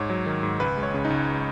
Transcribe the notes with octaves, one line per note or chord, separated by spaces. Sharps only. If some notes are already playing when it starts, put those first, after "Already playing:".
Already playing: G#2 C#5
F#3
D#3
G#2
C#2 B4
G#3
C#5
C#3
D#4
C#2